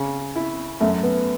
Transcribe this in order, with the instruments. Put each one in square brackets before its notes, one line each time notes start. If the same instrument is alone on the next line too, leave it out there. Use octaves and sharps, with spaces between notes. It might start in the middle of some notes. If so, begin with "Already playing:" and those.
Already playing: [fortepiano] C#3
E4
[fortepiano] F#2 [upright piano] A3
[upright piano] B3